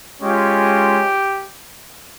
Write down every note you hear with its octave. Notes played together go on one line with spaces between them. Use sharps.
G#3 C#4 F4 G4